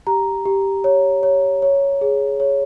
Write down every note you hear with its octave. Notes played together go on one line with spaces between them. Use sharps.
G4 A#5
G4
C#5
C#5
C#5
G#4
C#5